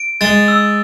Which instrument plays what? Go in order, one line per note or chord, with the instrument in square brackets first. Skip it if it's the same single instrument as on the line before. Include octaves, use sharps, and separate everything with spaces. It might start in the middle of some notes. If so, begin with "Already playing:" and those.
Already playing: [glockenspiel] D7
[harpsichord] G#3 [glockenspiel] A6
[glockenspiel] E6